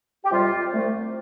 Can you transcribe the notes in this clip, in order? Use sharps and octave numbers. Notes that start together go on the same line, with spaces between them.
G4
F2 C3 G3 F4
C2 C3 A3